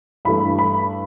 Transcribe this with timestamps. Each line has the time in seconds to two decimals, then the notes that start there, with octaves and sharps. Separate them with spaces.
0.25 G2 E3 A3 B5
0.59 B5